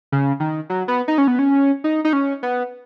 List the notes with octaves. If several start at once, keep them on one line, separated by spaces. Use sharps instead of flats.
C#3
D#3
F#3
B3
D#4
C#4
B3
C#4
D#4
D#4
C#4
B3